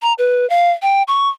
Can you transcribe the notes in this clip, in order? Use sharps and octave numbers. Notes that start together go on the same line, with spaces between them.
A#5
B4
F5
G5
C#6